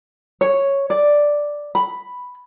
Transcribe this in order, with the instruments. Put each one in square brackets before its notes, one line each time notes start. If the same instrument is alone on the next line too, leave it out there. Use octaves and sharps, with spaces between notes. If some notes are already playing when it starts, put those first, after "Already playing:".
[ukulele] C#5
D5
B5